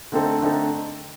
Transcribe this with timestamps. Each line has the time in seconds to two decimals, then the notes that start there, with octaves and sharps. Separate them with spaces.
0.12 D3 A3 C4 D#4 A4
0.42 D3 A3 C4 D#4 A4